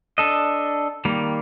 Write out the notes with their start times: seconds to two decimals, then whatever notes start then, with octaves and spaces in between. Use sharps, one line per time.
0.18 D4 A4 D#5
1.05 D#3 G3 A#3